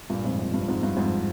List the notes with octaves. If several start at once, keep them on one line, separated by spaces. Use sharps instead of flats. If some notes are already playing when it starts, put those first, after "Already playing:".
G2 A#2
F2 G#2
F2
G2
F2 G#2
G2
F2 G#2